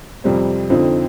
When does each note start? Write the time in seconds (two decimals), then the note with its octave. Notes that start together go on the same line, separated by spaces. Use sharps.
0.24 F2 C3 G3 C4
0.70 F2 D3 F3 C4 D#4